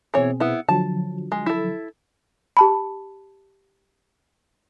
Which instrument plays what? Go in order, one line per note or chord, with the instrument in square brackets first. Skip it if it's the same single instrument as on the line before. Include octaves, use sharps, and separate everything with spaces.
[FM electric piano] B2 C4 G#4 [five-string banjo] E3 C#5
[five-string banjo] B3 E4
[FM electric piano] D3 F3 F#3 [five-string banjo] A5
[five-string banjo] G#3
E4 A4
[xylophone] G4 A5 B5